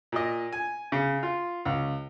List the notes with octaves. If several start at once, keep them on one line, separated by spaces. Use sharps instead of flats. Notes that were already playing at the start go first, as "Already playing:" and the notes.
A#2 D#5
G#5
C#3
F4
C#2